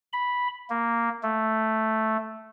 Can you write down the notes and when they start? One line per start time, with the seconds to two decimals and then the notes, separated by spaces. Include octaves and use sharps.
0.13 B5
0.70 A#3
1.23 A3